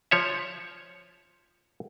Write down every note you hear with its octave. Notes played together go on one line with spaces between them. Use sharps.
F3 C#5 E5